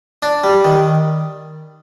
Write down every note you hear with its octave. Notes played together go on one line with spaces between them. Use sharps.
D4
G3
D#3